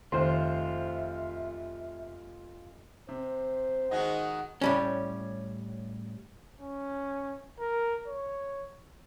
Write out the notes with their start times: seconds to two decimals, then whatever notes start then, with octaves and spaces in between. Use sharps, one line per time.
0.12 F1 D#3 F4 C5 E5
3.09 C3 C5
3.91 D#3 G#3 D#4 F#4 G#4 D#5 F#5
4.61 A2 G3 C#4
6.60 C#4
7.59 A#4
8.08 C#5